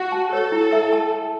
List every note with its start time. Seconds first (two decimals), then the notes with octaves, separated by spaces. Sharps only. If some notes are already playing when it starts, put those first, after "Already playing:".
Already playing: F#4 F#5
0.12 A5
0.32 A4 C#5
0.52 E4
0.73 E5
0.93 A5
1.12 A5